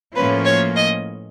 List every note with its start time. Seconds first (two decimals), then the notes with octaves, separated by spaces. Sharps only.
0.15 A2 F3 A#3 C#4 F4 B4
0.45 C#5
0.76 D#5